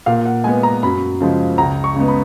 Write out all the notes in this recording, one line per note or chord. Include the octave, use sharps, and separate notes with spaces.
A#2 F5
F#5
G#3 B3 G#5
A#5
F#2 B5
C#3 F3 G#3
C#2 A#5
C#6
C#3 G#3 B3
B5